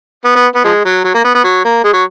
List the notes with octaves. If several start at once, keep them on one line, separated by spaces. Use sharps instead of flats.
B3
B3
B3
F3 G#3
F#3
F#3
A#3
B3
B3
F#3
A#3
G#3
F#3